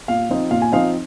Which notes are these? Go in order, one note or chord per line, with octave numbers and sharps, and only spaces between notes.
A#2 F5
F3 C4 D#4
A#2 F5
G#5
F3 C4 D#4 F5